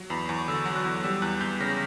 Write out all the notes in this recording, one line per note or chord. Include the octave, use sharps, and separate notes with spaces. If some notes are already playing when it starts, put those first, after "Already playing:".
Already playing: F#3
E2 B5
E2 C#6
D3 E6
F#3
F#6
E2
G3 E6
E2 F#6
E2 G6
C#3 A#6